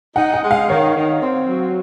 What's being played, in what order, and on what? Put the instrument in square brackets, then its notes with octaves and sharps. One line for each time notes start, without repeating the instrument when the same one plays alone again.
[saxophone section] D#4 [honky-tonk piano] F#5
[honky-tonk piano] F#5
[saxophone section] G#3
[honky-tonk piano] F5
[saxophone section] D#3 [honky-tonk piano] C#5
[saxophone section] D#3
C4
F#3